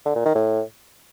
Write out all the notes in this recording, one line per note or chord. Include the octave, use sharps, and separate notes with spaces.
D3
A#2
D#3
A2